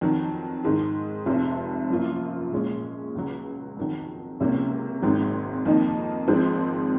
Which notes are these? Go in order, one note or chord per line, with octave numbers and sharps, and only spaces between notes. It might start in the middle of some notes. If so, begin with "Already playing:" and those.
F2 D#3 F#3
G#2 D#3 G#3
F1 F2 C3
F#2 F3 A#3 F4
A#2 G#3 C#4 G#4
C#2 C#3 F#3
F2 D#3 F#3
C#2 C3 F#3 A#3 C#4
G#1 G#2 D#3 F#3 C4
F2 D#3 A#3 D#4
G#1 G#2 F3 G#3 C4